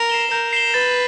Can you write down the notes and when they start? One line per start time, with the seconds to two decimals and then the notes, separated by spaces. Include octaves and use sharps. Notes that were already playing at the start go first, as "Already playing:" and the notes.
Already playing: A#4
0.10 C7 E7 G7
0.30 A#4 G6
0.53 C7 E7 G7
0.74 B4 A6